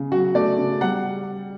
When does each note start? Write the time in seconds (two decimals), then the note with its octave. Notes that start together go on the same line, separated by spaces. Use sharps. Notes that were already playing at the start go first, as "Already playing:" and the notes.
Already playing: C#3
0.12 F#3 F#4
0.35 A3 D5
0.58 C#3
0.81 G3 F#5